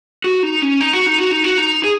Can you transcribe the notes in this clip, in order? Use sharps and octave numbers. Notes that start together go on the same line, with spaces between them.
F#4
D#4
C#4
D#4
F#4
D#4
F#4
D#4
F#4
D#4
G#4